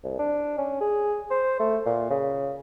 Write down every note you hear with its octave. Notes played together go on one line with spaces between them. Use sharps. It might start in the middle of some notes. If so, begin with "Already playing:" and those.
C2
D4
C#4
G#4
C5
A3
A#2
C#3